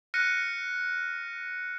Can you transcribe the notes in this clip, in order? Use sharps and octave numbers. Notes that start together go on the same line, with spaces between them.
F6 F#6 A#6 C#7 D#7